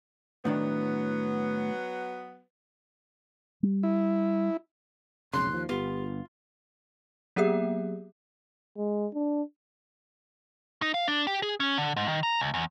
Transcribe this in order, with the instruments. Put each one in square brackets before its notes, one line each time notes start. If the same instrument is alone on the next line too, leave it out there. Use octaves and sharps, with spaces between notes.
[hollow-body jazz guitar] A2 D#3 D4 [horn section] F#3 B3
[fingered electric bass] G3
[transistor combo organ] E4
[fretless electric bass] F1 B1 C#3 [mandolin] C6 [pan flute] F#6
[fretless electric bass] D#2 F3
[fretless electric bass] G1 B3 [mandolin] F4 [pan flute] G4
[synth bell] F#3 A#3 B3 G4 G#4 E5
[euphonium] G#3
D4
[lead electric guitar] D#4
F5
D4
G4
G#4
C#4
D3
G#2
D#3
A#5
C#2
E2